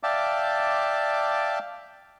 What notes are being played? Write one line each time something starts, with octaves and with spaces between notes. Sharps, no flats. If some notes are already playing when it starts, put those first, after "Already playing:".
D5 E5 F5 G5 A5 D6